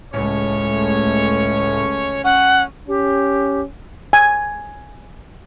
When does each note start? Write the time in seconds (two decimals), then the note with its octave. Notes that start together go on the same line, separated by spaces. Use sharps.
0.14 C#2 A2 G#3 A3 C#4 C#5
2.24 C#4 F#5
2.88 C#4 G4
4.13 G#5